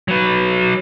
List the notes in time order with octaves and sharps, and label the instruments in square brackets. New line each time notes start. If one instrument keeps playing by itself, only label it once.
[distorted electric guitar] F#3 B4